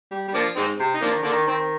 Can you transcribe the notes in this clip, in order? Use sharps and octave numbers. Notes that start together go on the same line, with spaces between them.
G3
G3
F3 A#3 D4
G#2 C4 D#4
C3
D#4
F3 A#3 D4
D#3
D3 A#3 D4
D#3
D#3 C4